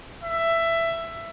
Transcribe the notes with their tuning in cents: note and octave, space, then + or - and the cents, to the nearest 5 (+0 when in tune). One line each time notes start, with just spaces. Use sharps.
E5 +15